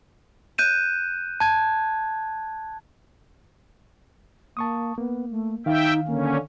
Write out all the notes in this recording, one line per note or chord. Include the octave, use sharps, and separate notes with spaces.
F#6 G6 D#7 E7
A5 G#6
A#3 A5 C#6 D#6
A#3 B3
A3
D#3 D#4 E5 F5 G5
D3 A#3 C#4